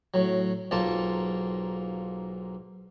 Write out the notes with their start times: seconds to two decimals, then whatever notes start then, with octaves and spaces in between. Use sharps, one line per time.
0.14 A2 F#3
0.71 B1 G#2 A#3 F4 A5